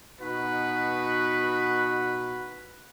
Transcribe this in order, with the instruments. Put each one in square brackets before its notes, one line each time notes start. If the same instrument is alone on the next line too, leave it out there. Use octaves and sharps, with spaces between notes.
[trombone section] B2 D#4 F#4 [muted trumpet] B4